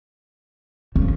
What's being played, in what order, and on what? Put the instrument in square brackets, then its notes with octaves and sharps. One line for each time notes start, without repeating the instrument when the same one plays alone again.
[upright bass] C#3